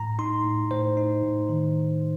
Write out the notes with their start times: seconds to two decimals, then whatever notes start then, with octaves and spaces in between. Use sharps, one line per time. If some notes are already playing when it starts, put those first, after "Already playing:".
Already playing: A2 A#5
0.19 D#4 C6
0.44 A2
0.71 A2 C5
0.97 D#4
1.23 A2
1.49 D#3